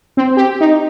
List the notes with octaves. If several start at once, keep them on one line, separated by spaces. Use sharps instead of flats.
C4
G4
D#4